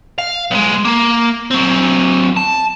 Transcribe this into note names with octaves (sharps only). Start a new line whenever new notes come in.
F5
B1 G#3
A#3
F#3 C4
A5